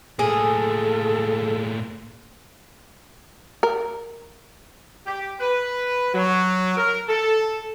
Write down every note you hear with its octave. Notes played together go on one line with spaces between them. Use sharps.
A2 A#3 G#4 A4
A#4
G4
B4
F#3
A#4
A4